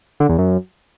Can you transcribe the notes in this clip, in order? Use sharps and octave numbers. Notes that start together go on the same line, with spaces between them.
D3
E2
F#2